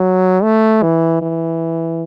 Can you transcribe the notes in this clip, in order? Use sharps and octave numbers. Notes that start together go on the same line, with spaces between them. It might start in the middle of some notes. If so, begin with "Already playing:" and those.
Already playing: F#3
A3
E3
E3